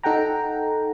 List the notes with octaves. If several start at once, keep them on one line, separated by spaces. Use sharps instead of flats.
D#4 A4 F#5 G5 A#5